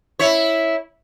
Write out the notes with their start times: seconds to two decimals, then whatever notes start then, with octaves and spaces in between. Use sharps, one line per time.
0.19 E4 C#5